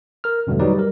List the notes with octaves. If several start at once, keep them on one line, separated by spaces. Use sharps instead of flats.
A#4 F6
E2 G2 B2 D3 F#3 A3
F#3 G3 D#4 G4 B4 D5
G3 A#4